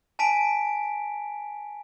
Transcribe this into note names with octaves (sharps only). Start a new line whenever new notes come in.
G#5 A5 B6 D7